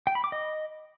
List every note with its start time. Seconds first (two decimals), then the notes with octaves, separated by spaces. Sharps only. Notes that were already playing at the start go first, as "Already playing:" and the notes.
0.07 G5
0.15 B5
0.24 D6
0.32 D#5